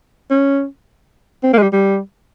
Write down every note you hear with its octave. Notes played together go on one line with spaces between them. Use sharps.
C#4
C4
A#3
G#3
G3
G3